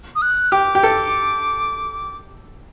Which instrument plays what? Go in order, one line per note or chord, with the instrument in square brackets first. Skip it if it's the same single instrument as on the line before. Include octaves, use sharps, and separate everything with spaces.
[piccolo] D#6
F#6
[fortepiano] G4 [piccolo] D6
[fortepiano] G4
A4